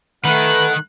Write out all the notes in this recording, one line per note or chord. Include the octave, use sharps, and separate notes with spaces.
D#3 A3 B4 F#5 F#6